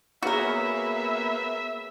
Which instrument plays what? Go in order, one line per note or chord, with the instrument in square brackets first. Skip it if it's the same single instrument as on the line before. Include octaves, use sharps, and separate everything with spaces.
[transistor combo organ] A#3 B3 [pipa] F#4 A#4 [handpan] G#4 C#5 [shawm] E5